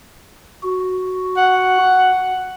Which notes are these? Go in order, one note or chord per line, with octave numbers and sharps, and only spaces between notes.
F#4
F#5